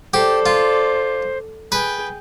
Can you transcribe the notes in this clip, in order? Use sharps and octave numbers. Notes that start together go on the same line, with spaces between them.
G4 A4 C5 D5
F4
G#4 B4 G5